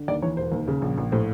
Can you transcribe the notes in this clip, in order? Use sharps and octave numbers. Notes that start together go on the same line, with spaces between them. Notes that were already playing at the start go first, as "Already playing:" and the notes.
Already playing: D3
D#2 D5
E3 C#5
E1 C5
D#2
C#3
A#1
A#1
A2 C5